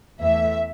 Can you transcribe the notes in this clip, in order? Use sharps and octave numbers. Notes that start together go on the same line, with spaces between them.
E2 E3 A3 E5